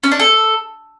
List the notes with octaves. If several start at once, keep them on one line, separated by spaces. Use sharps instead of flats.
C#4
D4
A4